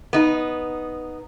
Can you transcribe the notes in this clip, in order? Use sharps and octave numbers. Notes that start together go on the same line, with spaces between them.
B3 D#4